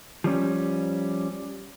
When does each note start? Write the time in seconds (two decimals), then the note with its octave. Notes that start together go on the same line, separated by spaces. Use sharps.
0.24 F3 G3 C#4